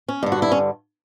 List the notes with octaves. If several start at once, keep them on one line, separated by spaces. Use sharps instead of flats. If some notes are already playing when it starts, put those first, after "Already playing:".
C#4
G2 D3
F#4
E4
C#4